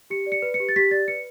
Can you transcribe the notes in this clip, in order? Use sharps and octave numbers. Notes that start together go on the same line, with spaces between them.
G4 C#7
D5
C#7
B4
C#7
G4
A6
G4 B6
D5 A6
B4 C#7